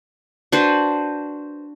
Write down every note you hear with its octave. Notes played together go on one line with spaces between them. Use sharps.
D4 F#4 B4 C5